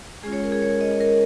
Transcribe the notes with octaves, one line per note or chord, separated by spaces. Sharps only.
G#3 C#4 F4 G#4
C#5
A#4
G#4
C#5
D#5
A#4